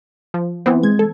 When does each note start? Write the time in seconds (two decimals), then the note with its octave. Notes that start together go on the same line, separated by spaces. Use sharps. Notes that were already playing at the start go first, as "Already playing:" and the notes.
0.34 F3
0.66 E3 B3 C4
0.83 G#3 G#6
0.99 A4